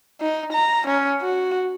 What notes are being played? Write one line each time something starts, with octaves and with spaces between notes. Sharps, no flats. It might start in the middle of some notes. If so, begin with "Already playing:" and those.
D#4
A#5
C#4
F#4